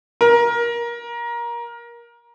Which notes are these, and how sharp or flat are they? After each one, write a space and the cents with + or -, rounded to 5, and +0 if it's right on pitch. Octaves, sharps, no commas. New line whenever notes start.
A#4 +20